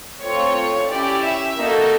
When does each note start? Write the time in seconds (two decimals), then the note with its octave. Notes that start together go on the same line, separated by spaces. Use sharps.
0.21 A3 C4 F4 C#5
0.90 C#4 E4 G4 D5
1.24 E5
1.58 A#3 D#4 F#4 A4